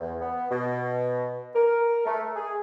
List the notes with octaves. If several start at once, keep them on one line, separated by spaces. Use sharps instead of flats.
E2
B3
B2
A#4
A3
G#4